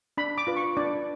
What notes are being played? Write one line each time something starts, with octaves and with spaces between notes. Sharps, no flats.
D4 B5
D6
F4 B4
C#6
D4 D5